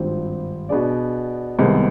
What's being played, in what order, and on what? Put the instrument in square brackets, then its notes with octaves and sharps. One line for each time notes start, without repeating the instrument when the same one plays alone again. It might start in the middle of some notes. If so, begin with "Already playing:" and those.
Already playing: [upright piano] G#1 G2 F3 C4 G4
B2 B3 D4 G#4 D5
C2 C3 D#3 G#3 B3